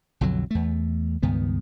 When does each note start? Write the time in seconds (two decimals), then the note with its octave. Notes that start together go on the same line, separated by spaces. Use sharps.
0.21 B1 F2 D3 F#3
0.51 E2 A3
1.23 C#2 G2 D#3 B3